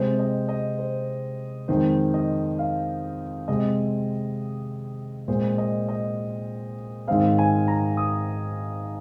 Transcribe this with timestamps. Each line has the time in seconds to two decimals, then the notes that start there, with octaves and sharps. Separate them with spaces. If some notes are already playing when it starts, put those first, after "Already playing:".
Already playing: C3 G#3 C4 C5
0.19 D#5
0.49 D#5
0.79 C5
1.68 F2 D#3 G#3 C5
2.14 D#5
2.59 F5
3.48 C3 G#3 C4 D#5
5.28 A#2 G#3 C4 C5
5.58 D#5
5.89 D#5
7.07 G#2 D#3 G#3 C4 F5
7.38 G#5
7.68 A#5
7.97 D#6